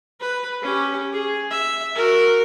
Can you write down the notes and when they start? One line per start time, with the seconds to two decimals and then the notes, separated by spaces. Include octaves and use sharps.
0.21 B4
0.63 C#4 G4
1.13 G#4
1.51 E5
1.95 F#4 A#4